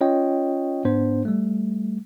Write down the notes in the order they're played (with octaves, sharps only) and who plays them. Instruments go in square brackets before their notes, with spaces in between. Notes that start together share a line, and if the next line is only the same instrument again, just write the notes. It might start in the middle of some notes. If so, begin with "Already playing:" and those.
[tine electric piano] C#4 F4 C#5 D#5 G5
G#2 B3 D4 C5
G3 A3